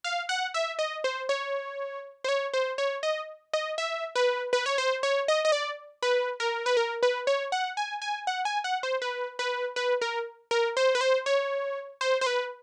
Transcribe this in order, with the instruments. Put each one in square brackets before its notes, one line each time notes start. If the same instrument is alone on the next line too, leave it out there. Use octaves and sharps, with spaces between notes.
[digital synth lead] F5
F#5
E5
D#5
C5
C#5
C5
C#5
C5
C#5
D#5
D#5
E5
B4
B4
C#5
C5
C#5
D#5
D#5
D5
B4
A#4
B4
A#4
B4
C#5
F#5
G#5
G#5
F#5
G#5
F#5
C5
B4
B4
B4
A#4
A#4
C5
B4
C5
C#5
C5
C5
B4